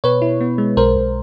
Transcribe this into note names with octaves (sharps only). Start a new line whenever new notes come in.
B2 B4 C#5
E4
B3
G#3
B1 A#4 C5
B1